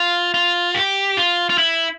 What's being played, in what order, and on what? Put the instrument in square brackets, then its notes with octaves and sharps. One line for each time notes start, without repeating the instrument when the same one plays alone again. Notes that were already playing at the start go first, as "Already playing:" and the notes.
Already playing: [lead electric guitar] F4
F4
G4
F4
F4
E4